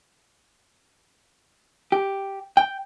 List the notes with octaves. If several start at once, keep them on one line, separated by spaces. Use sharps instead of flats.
G4
G5